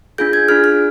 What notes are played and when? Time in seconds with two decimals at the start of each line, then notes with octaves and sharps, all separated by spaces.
0.18 D4 F4 G#4 G6
0.33 G#6
0.48 D4 F4 G#4 F6
0.64 F6